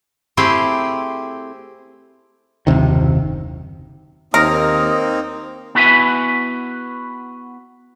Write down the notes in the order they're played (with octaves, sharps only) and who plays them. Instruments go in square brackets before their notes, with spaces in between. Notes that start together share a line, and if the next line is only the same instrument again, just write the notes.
[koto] A3 C4 E4 G4 G#4
[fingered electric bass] F#1 D#2 C3 D#3
[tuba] D#2 [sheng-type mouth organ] A#3 C4 D#4 [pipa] A#4 [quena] D#6
[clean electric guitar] B3 E4 F#4 B4 E5 G#5